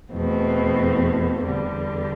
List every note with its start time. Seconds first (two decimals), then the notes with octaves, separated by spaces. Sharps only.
0.13 E2 B2 A3 C4
1.43 E2 D3 G3